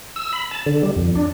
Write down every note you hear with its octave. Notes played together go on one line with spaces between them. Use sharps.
E6
B5
A5
D3
G3
F2
D4